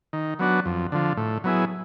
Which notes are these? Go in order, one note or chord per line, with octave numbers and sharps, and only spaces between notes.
D#3
F#3 B3 D4 F#4
F2
D3 F3
A2
F#3 B3 E4 G#4